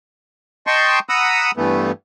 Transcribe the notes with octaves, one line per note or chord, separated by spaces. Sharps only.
D#5 G5 A5 C6 C#6
F#5 A#5 B5 D#6 E6
G2 E3 A3 B3